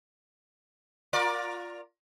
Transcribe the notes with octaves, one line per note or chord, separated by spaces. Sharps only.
F4 A#4 D5